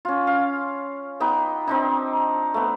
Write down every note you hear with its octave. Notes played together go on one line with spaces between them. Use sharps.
C#4 F4
F5
B3 D#4 G5 D6
C4 D4 D#4
A3 B3